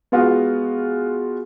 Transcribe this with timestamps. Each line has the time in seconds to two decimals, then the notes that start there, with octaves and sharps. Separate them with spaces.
0.12 G#3 B3 F4 F#4